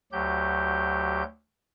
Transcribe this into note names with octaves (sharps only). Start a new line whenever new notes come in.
D2 F#3 G4 G6